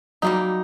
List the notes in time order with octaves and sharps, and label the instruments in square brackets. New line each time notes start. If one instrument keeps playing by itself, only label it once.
[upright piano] F#3 [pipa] G3 A#3 D#4